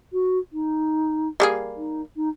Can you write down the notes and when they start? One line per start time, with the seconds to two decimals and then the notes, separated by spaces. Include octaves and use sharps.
0.13 F#4
0.53 D#4
1.40 G3 A#3 G#4
1.76 D#4
2.16 D#4